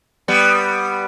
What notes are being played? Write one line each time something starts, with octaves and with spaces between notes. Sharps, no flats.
G3 B3